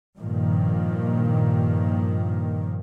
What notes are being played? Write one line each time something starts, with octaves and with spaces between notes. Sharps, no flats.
G2 A#2 D#3 F3 A#3